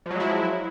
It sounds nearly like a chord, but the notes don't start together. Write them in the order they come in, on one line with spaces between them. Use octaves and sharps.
F3 F#3 G#3 E4